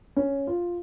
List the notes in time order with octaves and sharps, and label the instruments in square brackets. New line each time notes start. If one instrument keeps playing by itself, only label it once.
[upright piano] C#4
F4